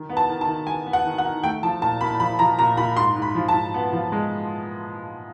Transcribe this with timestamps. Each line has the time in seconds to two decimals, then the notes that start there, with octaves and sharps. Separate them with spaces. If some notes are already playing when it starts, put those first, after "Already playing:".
Already playing: D#3
0.09 B3
0.17 A5
0.29 D#3
0.41 A5
0.47 D#3
0.67 B3 G#5
0.86 B3
0.93 F#5
1.05 D#3
1.18 F#5
1.25 D#3
1.43 A3 G5
1.63 F3 A5
1.81 A#2 A5
2.01 A#2 B5
2.20 F3 B5
2.39 F3 A#5
2.59 A#2 A#5
2.77 A#2 B5
2.97 G#2 C6
3.16 G#2
3.22 B5
3.35 F3
3.49 A5
3.54 G#2
3.74 B3
3.93 F3
4.12 G#3